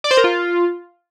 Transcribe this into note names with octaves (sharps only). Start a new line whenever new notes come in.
D5
C5
A#4
F4